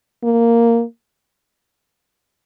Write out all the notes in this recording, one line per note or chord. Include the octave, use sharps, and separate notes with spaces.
A#3